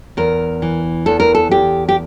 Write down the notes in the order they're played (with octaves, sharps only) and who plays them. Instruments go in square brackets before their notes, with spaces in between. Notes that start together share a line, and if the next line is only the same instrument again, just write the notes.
[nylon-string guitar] E2 A#4
E3
E2 A4
A#4
A4
E2 G4
G4